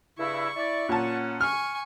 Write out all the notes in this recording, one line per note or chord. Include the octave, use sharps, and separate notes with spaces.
G2 C#3 E4 C#6
E4 D5
A#2 C#4 F#5 A5
G#5 C#6 F6